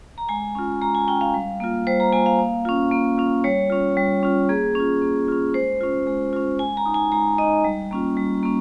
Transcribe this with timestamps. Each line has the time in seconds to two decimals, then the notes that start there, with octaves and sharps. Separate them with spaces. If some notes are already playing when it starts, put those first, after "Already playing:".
0.18 A#5
0.29 G#3 G#5
0.55 C#4 F4
0.82 G#3 A#5
0.95 G#5
1.07 C#4 F4 G5
1.21 F5
1.34 G3
1.60 A#3 F4
1.87 G3 C5
2.00 A#5
2.12 A#3 F4 G#5
2.26 F5
2.39 A#3
2.65 C#4 F4
2.91 A#3
3.18 C#4 F4
3.44 G3 C#5
3.70 C#4 F4
3.97 G3
4.23 C#4 F4
4.49 A#3 G#4
4.75 C#4 F4
5.02 A#3
5.28 C#4 F4
5.54 G#3 C5
5.81 C#4 F4
6.07 G#3
6.33 C#4 F4
6.59 G#3 G#5
6.77 A#5
6.86 D#4
6.94 G#5
7.12 G#3 A#5
7.38 D#4 D#5
7.65 G3
7.91 A#3 C#4 F4
8.17 G3
8.43 A#3 C#4